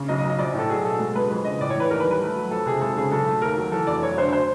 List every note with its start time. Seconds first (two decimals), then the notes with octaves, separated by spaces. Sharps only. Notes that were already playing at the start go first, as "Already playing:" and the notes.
Already playing: C#3
0.08 B1 D#5
0.19 D#5
0.24 B1
0.30 D#5
0.39 A#1 D5
0.54 A2 A4
0.70 F#3 G#4
0.85 B2 A4
0.99 G#3 A4
1.16 G#3 B4
1.30 F2 B4
1.45 C#3 D#5
1.60 A2 D5
1.70 C#5
1.75 E3 B4
1.90 D#2 A#4
2.00 B4
2.05 G3
2.11 B4
2.21 A3
2.35 F#3
2.51 F2 A4
2.66 C3 G#4
2.81 G#1 A4
2.97 C#3 G#4
3.12 B1 A4
3.26 A3
3.42 D#2 A#4
3.57 F#3
3.71 E3 A4
3.87 F1 D5
4.02 F#3 C#5
4.18 D3 C5
4.33 C5